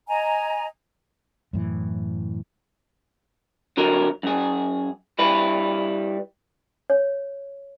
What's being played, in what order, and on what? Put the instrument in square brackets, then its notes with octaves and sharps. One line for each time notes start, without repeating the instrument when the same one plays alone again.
[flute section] D#5 G#5 A#5
[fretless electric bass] F#2 A2 E3
[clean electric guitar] D3 F#3 A#4
F#2 G#4
G3 E4 B4
[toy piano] C#5